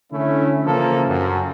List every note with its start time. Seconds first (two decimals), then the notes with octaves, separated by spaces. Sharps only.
0.11 D3 A3 C#4 E4
0.64 C#3 E3 F3 A#3 A4
1.07 F#2